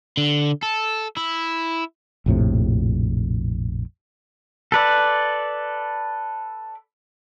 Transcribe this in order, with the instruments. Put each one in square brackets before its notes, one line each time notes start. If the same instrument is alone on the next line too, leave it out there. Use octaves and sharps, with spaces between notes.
[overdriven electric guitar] D3
A4
E4
[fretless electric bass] A#1 F2 A2 C3
[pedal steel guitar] A4 B4 D5